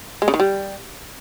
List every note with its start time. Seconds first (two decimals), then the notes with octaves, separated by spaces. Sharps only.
0.22 G#3
0.28 C#3
0.34 D#3
0.40 G3